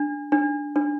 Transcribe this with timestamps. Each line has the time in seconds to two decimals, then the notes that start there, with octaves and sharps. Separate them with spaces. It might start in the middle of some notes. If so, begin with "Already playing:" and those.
Already playing: D4
0.32 D4
0.76 D4